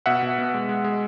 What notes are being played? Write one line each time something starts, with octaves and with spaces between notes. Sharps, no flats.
B2 E5 F#5
B2
B3
G#3
G#3
G#3